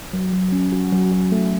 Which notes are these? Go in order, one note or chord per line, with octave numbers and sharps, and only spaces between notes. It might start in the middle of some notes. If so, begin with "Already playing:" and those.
F#3
F#3
C#4
F#4
F#3
F#3
A3